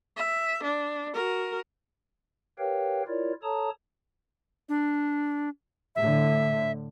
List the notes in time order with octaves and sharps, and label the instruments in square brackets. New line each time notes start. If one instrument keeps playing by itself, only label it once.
[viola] E5
D4
F#4 A#4
[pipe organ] G4 A#4 B4 C#5 F5 G5
E4 F4 A#4 C#5 D5
A4 C#5 A5 A#5 D#6
[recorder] D4
[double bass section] A2 D3 [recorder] E5